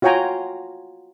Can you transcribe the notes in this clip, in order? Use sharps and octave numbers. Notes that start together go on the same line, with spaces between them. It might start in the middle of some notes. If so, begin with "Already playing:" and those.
F4 F#4 C#5 G5 G#5 A#5